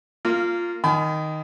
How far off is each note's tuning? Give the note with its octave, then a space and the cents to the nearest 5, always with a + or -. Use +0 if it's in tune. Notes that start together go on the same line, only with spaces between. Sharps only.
A#3 -20 F4 +0
D#3 +0 G#5 +35 B5 +35